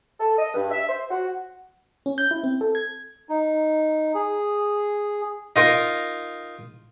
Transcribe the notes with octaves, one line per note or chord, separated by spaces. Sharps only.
A4
D#5
G2
E5
C5
F#4
C#4
G6
E4
C4
A4
G#6
D#4
G#4
D#4 F4 A#4